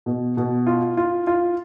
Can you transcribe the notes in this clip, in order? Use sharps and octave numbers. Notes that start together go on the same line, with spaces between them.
B2
B2
F4
F4
F4